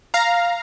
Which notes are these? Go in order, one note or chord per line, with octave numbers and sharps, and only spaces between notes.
F5 A#5